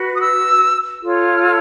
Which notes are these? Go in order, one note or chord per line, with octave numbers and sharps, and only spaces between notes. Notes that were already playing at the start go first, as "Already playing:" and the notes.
Already playing: F#4 B4
D#6
E6
F4 A4 C#5
F6
E6